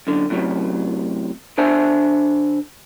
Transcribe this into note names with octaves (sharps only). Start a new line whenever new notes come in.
F#2 D3
F#2 A2 C3 E3 F#3
D3 D4 C5 E5 G#5 A5